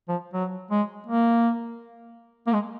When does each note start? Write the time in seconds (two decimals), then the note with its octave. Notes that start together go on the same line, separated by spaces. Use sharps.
0.08 F3
0.33 F#3
0.71 G#3
1.06 A#3
2.47 A#3
2.53 G#3